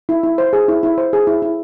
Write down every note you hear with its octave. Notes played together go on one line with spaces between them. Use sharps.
E4
E4
C5
G#4
E4
E4
C5
G#4
E4
E4